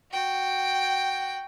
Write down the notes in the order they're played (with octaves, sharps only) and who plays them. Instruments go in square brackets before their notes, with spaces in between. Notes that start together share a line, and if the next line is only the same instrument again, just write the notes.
[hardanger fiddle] F#4 G5